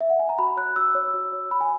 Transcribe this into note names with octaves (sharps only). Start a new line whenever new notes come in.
E5
F#5
G#5
A#5
F#4 B5
C#5 F#6
F#4 E6
C#5
F#4
C#5
F#4 B5
G#5